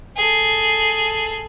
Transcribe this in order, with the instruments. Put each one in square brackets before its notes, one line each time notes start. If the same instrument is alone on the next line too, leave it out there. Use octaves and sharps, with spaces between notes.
[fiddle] G#4 A4